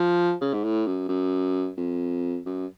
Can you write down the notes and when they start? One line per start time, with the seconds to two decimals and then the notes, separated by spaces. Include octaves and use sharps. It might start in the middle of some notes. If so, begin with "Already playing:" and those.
Already playing: F3
0.41 C#3
0.53 G#2
0.64 A2
0.86 F#2
1.09 F#2
1.77 F2
2.46 F#2